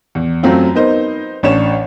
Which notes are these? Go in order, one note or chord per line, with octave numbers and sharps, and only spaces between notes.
E2
F#2 F#3 A3 C4 F4
B3 D#4 A#4 C5
A1 C#4 D4 C#5 E7